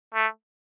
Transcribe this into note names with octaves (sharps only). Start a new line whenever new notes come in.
A3